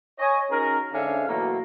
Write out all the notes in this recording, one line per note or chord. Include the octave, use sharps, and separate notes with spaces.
C#5 D#5 G#5
C#4 D#4 F#4 G#4 A#4
G#2 D3 C#4 D4 E5 F5
B2 E3 F#3 A3 A#3